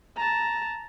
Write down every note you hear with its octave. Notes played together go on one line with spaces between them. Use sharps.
A5 A#5